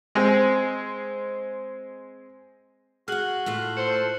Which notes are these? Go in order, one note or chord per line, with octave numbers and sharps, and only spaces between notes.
G#3 C4
F#4 G#4 F#5 F6 F#6 F#7
A2 A3 F4
A4 C5 C#7